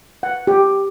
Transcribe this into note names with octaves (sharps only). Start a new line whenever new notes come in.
F#5
G4